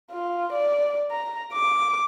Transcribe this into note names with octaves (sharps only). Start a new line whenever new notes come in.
F4
D5
A#5
D6